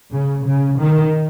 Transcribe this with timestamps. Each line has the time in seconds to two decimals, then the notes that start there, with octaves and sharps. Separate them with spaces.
0.13 C#3
0.46 C#3
0.79 D#3